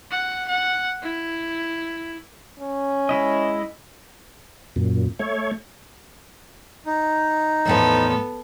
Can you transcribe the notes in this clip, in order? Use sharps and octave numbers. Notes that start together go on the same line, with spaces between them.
F#5
F#5
E4
C#4
G#3 E4 D#5
F#2 A#2
A3 C#5
D#4
E2 A2 F3 B3 A4